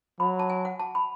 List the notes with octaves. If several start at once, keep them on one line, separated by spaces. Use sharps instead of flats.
F#3 B5
A5
G#5
F#5
A5
B5